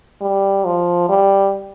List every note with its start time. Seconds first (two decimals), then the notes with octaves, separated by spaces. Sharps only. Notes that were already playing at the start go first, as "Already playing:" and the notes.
0.21 G3
0.65 F3
1.09 G3